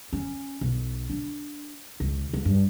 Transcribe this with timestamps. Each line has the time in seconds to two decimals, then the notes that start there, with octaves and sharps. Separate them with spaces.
0.13 C#4
0.61 B1
1.10 D4
2.00 C#2
2.33 C#2
2.45 G2